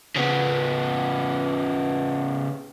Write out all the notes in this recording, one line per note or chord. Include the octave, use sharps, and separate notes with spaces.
C#3 B3